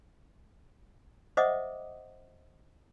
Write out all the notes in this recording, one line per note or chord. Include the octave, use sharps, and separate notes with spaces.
C5 D#5 E5 F#5 D6 D#6